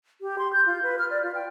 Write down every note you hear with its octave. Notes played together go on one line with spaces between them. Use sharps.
G4
C6
G6
F4
B4
F6
D5
F4
G5